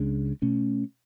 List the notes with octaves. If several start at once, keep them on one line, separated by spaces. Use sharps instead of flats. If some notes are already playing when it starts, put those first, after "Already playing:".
Already playing: C#2 C#3 G#3 D4
B2 A3 C#4